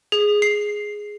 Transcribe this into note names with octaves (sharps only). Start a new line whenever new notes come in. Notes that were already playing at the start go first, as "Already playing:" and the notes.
G#4
C7